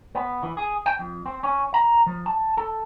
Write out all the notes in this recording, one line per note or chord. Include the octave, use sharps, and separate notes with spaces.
B3
E3
G#4
G5
F2
C4
C#4
A#5
F3
A5
A4